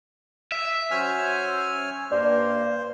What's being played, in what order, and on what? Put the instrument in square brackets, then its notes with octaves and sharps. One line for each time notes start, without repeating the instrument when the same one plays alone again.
[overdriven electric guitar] E5
[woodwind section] F#3 C#4 C5 [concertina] C#5 G#5 F6
[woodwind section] G2 A#3 [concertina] C5 [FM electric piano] D5